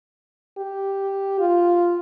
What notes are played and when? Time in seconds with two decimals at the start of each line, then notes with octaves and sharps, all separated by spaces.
0.58 G4
1.39 F4